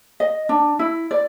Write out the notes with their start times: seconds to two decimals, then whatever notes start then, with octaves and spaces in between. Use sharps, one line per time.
0.20 D#5
0.49 D4
0.79 E4
1.11 D5